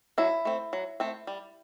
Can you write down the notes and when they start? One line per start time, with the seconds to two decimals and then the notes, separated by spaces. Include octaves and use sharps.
0.18 F#3 E4
0.45 A3 C4
0.73 F#3
1.00 A3 C4
1.27 G3